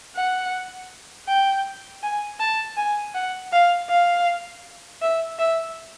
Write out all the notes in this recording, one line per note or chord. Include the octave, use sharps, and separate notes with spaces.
F#5
G5
G#5
A5
G#5
F#5
F5
F5
E5
E5